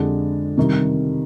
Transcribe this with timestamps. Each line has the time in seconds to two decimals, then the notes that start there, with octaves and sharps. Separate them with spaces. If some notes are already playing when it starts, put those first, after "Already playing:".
Already playing: F2 D3 G#3 D4 G4
0.58 C3 D#3 G3